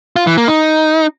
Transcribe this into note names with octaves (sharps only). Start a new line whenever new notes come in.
F4
E3
A#3
D#4